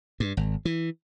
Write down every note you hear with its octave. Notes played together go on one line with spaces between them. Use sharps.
G2
G#1
E3